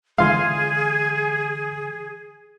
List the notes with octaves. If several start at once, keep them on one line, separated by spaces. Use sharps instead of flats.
D3 E3 G#3 F4 G#4 F5